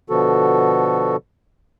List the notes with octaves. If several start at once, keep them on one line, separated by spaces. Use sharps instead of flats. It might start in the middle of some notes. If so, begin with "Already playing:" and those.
B2 D3 F3 B3 F#4 A4